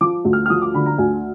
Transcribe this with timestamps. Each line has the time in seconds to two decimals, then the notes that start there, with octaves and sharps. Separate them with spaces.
0.01 F3 D6
0.25 D2
0.33 F6
0.46 F6
0.50 F3 D#6
0.62 D6
0.74 D3 B5
0.86 A#5
0.98 D2 G#5